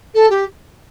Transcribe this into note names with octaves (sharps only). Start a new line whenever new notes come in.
A4
G4